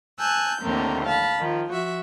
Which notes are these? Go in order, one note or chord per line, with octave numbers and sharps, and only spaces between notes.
G#5 A5 E6 F#6 G6
D#2 A2 D3 A#3 C4
F5 A5 B5
D#3 F3
F3 F#4 E5